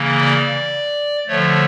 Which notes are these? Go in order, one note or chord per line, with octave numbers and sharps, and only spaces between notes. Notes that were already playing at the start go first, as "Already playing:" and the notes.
Already playing: C#3 E3 A#3
D5
D3 F3 A3 C#5